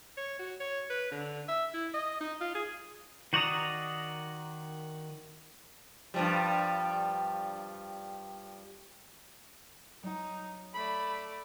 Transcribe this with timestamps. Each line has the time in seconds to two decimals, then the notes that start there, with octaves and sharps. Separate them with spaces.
0.17 C#5
0.39 F#4
0.60 C#5
0.90 B4
1.12 D3
1.48 E5
1.74 E4
1.94 D#5
2.21 D#4
2.41 F4
2.55 G#4
3.33 D#3 F#4 D5 A#5 D#6
6.14 G2 F3 G3
10.03 F#3 D#4 F#5
10.74 A3 D5 B5